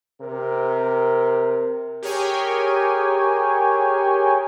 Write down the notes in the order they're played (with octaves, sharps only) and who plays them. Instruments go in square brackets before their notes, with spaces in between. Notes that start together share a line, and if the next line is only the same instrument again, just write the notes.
[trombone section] C3 A#4
[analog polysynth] G4 G#4 A#4 C#5 G5 G#5